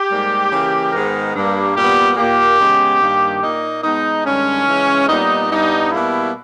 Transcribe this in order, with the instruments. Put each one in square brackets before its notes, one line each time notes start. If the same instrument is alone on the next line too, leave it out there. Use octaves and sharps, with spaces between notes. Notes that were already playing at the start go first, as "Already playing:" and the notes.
Already playing: [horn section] G4
G#2 G3 A#3
C#3 E3 A#3
G#2 D#3 G#3 B3 A#4
G2 G3 A#3
A#2 G3 B3 G4
A#2 A#3 G4
C#3 G#3 B3
G2 D#3 A#3
A#2 A#3 D#4
B2 G#3 B3 D#4
G2 D#3 G#3 C#4
C#3 E3 G#3
A#2 G3 B3 D#4
G2 G3 B3 D#4
B2 G3 A#3 E4